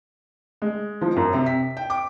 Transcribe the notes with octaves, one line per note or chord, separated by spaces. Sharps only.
G#3
F3
F#2
C3
B6
G5
D6